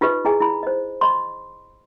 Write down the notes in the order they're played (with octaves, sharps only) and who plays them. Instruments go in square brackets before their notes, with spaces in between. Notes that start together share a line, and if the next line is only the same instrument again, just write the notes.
[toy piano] D#4 F4 G4 B4 D#5
E4 G#4 D#5 G#5
E4 B5
C5 D#5
D#5 B5 C6